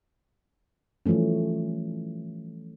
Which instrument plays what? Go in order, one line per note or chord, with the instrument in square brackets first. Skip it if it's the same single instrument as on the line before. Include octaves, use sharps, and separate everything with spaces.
[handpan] E3 F3 G3 A3 C#4